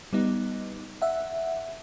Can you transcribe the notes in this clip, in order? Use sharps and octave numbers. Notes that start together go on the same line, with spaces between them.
G3 B3 D#4
E5 F#5